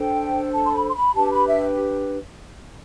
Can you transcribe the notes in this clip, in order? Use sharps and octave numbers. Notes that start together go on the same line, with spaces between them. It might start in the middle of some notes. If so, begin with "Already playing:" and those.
Already playing: D4 A4 C5 G5
A5
C6
B5
C6
B5
D4 G4 B4 A5
B5
E5